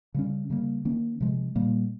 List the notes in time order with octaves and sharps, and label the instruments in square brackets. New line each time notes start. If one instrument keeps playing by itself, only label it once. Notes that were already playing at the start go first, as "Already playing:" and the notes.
[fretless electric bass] C#3 G3 C#4
C#3 G3 A#3
D#3 A#3 C#4
C3 F3 G#3
A#2 G3 A#3